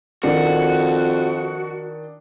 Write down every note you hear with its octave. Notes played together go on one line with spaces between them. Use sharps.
F2 D#3 D4 F#4